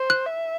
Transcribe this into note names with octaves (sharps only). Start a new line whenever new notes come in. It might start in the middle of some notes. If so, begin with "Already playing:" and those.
Already playing: C5
F#6
E5